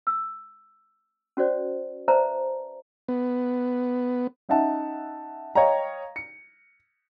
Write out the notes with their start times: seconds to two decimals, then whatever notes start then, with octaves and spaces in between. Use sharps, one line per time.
0.07 E6
1.37 C#4 F#4 C5 D5
2.08 B4 C5 D5 E5 A5 A#5
3.08 B3
4.49 C#4 D#4 E5 F#5 A5
5.55 C#5 D#5 F5 G5 A#5
6.16 C#7